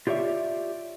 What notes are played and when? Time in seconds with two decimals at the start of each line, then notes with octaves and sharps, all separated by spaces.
0.07 F4 G4 C#5 D5 E5